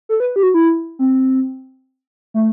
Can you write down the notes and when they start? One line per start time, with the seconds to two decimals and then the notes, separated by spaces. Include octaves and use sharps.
0.09 A4
0.20 B4
0.36 G4
0.43 F#4
0.54 E4
0.99 C4
2.34 A3